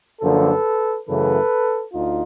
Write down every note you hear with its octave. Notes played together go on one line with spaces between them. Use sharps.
F#2 D3 F3 A#3 A4 B4
F#2 C#3 E3 A3 A4 B4
D2 D#4 F4